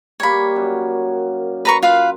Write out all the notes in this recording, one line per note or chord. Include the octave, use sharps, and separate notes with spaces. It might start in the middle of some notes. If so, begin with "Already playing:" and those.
G3 A#3 C#5 B5
F#2
B4 A#5 C#6
F4 B4 F5